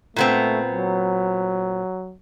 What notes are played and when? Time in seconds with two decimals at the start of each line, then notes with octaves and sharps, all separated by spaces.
0.16 A#2 A3 B3 C4
0.66 F#3